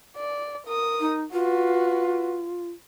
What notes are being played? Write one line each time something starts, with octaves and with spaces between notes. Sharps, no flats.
D5
A#4 D#6
D#4
F4 F#4 B4